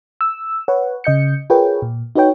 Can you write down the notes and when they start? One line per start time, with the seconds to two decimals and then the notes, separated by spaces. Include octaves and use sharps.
0.21 E6
0.68 B4 C#5 F#5
1.04 C#3 D#5 G6 C#7
1.50 F4 G#4 A#4 B4 C#5 G5
1.82 A#2
2.16 D#4 F#4 B4 C#5 G5